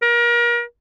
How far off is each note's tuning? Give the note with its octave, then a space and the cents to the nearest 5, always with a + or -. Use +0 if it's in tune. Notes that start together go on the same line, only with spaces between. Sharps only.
A#4 +35